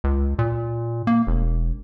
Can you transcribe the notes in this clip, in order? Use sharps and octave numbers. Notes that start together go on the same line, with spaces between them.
C#2
A#2
A#3
E1